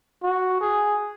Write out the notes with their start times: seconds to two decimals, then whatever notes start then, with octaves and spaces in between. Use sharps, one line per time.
0.23 F#4
0.61 G#4